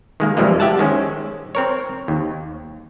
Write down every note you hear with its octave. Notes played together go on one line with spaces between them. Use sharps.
D#3 G#3 A#3
F2 E3 F3 G3 G#3 A#3
G4 E5 F#5 A5
D#3 G#3 C#4 C5
C4 A#4 C#5
D#2